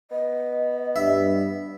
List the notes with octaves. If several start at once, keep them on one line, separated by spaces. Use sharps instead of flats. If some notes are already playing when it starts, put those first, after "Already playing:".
B3 D#5
G2 E5